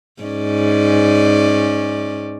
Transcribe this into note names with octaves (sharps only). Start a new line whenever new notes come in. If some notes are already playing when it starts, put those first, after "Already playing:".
G#2 C#4 D5